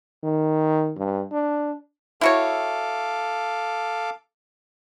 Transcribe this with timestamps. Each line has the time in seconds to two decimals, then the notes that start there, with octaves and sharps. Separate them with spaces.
0.23 D#3
0.97 G2
1.32 D4
2.21 E4 F#4 A4 C#5 F5 D6